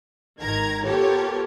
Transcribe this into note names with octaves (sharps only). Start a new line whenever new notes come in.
G#1 D#3 A#4 A#5 G#6
B3 F4 G4 A4 A#4 C#5